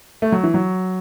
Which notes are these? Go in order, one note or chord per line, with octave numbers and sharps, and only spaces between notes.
A3
F#3
E3
F#3